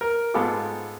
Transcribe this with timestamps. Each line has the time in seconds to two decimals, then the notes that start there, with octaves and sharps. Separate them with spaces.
0.01 A#4 A#5
0.34 G#2 B3 F4 G#4 A4 D6